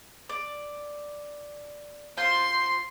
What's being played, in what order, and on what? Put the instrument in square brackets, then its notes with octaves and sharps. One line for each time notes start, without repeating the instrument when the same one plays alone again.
[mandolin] D5
[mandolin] F4 C5 [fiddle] C6